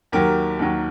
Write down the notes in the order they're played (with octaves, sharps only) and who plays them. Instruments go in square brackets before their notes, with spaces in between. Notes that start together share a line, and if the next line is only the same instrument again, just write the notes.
[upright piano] D#2 D#3 F#3 G4 A#4
D#2 D#3 F#3